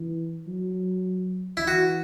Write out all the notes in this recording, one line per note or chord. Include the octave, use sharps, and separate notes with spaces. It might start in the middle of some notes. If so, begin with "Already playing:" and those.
Already playing: E3
F#3
E4
E3 F#4